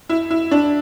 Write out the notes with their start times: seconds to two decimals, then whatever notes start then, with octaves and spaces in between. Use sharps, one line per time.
0.09 E4
0.31 E4
0.51 D4